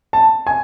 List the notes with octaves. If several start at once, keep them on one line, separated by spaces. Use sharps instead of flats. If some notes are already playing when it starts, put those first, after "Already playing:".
A5
G#5